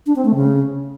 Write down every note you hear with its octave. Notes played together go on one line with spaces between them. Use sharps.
D4
C4
A3
C#3